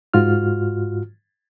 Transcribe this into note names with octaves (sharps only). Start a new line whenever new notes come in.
G#2 F4 F#4 F6